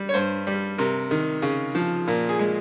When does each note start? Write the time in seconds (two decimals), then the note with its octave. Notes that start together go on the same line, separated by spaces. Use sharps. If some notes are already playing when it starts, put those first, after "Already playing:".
Already playing: G3
0.09 C#5
0.14 G2 C5
0.47 G3
0.78 C3 A#4
1.11 D#3
1.42 C#3
1.75 F3
2.07 A#2 A#4
2.29 G#4
2.39 G#3